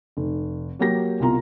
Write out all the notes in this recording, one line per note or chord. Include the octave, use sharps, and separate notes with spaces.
F1
F#3 A#3 G4 A#6
C2 B2 F4 A#5